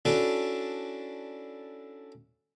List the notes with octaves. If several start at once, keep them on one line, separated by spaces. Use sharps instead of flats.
C#4 D4 E4 F#4 A4